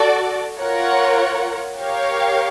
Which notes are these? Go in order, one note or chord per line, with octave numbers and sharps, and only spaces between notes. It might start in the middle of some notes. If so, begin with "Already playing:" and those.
Already playing: F#4 A4 D5
F4 A#4 C#5 F#5
G4 A#4 C#5 F5